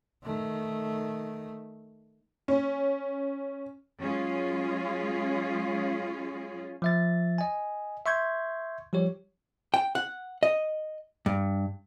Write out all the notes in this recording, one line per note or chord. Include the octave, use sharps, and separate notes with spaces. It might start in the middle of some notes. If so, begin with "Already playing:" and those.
D#3 A3
C#4
F#3 G#3 C#4 F4 G#4
F3 E5 A6
D#5 G#5
E5 C6 C#6 G6 G#6
F3 G3 G4 C#5
G5
F#5
D#5
G2